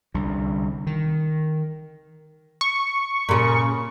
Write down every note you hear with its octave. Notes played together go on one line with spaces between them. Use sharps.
C2 D3
D#3
C#6
A#2 C#3